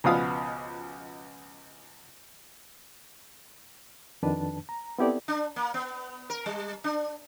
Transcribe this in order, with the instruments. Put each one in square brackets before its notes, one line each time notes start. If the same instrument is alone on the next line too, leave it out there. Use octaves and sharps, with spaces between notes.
[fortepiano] C#2 B2 F3 B3 F5 D#6
[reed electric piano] F2 D#3 D4 B4 A5
A#5
B3 C4 E4 G4 A4 D5
[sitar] D4
A#3
B3
A#4
G3
D4